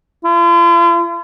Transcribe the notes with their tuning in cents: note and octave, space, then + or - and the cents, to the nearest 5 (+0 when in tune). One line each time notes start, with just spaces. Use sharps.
F4 -45